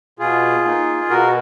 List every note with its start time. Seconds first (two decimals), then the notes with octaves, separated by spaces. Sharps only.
0.19 B2 F4 G#4
0.65 A#3 D#4
1.10 B2 F#4 A#4